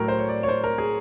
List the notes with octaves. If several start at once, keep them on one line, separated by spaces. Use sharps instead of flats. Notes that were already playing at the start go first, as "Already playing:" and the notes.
Already playing: A2 F#3 A3 A#4
C5
C#5
D5
C#5
C5
A#4
G#4